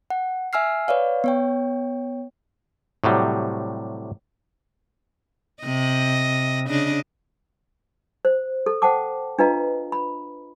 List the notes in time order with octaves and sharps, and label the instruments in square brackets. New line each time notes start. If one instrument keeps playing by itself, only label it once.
[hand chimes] F#5
E5 G#5 E6 F6 C7
B4 C#5 D5 F5
B3 C#5 G5
[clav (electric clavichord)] A2 C3 F#3 G3
[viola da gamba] C3 D#5
C#3 D4 D#5
[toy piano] C5
A4
C5 F#5 G5 A5 D6
D4 F4 B4 D#5 F5 A#5
B5